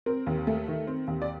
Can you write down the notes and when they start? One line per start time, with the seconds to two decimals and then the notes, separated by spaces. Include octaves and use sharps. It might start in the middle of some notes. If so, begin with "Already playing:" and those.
0.06 C4 A#4
0.27 D#2
0.47 A3
0.68 D#3
0.87 C4
1.08 D#2
1.22 D5